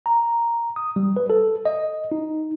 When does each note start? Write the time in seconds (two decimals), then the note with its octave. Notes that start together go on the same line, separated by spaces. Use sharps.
0.06 A#5
0.76 D#6
0.96 G3
1.16 B4
1.30 A4
1.65 D#5
2.12 D#4